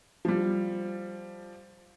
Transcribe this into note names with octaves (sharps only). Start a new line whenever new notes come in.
F3 G3